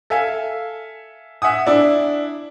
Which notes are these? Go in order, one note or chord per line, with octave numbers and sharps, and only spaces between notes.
A4 E5 F5 G#5
E5 F#5 G#5 D#6
D4 E4